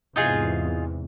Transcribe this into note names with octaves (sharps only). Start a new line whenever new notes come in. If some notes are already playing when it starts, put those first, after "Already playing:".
E2 G#2 C3 D#4 F4 G#4